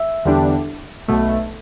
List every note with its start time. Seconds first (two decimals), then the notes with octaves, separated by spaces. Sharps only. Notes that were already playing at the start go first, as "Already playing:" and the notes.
Already playing: E5
0.25 E2 D3 G3 D4
1.08 B1 B2 A3